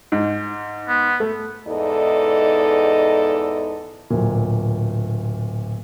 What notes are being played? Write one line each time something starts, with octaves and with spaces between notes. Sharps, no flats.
G#2
B3
A3
E2 G#2 D#4 A4 D5 D#5
D1 A#2